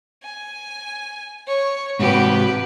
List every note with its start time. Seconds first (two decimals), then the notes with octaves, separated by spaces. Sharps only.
0.23 G#5
1.47 C#5
1.99 G#2 C3 F#4 G4 B4